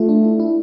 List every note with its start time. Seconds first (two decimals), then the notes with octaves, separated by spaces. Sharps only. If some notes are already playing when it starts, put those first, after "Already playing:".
Already playing: A3 F4
0.09 D4
0.24 E4
0.40 E4